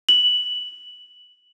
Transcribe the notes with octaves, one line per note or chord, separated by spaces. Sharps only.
F#7